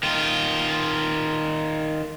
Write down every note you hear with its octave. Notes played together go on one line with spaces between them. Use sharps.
D#3 F4